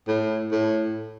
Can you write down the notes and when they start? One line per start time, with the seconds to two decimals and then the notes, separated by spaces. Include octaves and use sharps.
0.08 A2
0.51 A2